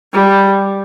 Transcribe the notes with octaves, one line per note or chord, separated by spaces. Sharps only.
G3